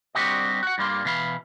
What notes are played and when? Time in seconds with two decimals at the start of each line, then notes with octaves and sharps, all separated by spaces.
0.15 G3 C4 D4 F#4 G4 D#5
0.63 F#4 F#5
0.78 G2 G3 A#3 C6
1.05 B2 E3 F5 B5